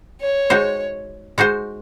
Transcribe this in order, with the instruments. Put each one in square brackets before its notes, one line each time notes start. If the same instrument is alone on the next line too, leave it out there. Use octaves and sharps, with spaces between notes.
[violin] C#5
[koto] G#3 D#4 F#4 C5
G#3 D#4 F#4 C5